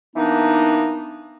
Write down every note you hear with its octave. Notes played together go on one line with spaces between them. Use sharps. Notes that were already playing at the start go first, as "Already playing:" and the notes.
E3 A#3 B3 D4 D#4